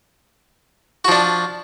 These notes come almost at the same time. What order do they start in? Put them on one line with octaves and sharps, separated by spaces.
F#4 F3 D4